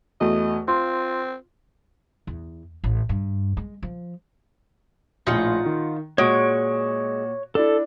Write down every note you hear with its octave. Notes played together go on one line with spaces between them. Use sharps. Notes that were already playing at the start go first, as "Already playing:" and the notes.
E2 A3 F#4 D#5
C4 F4 C6
E2
A1
G2
G#3
F3
A#1 A2 D#4 F4 F#5
D#3
A#2 G#3 F#4 C#5 C#6 D7
D4 E4 A4